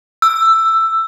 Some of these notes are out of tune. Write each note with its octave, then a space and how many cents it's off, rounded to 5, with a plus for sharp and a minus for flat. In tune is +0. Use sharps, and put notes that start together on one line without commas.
E6 +10